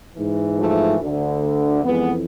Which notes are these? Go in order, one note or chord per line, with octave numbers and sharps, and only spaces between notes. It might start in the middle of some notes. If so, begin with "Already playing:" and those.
G#2 E3
F3 A3
D2 D3
F2 E3 G#3 B3